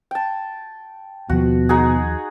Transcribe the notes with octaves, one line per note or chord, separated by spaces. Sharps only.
G5 A5
D#2 B2 F3 F#4
D#4 F#4 G#4